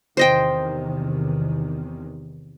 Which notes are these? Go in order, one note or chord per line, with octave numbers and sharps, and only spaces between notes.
E2 C3 D#3 C5 D#5 G5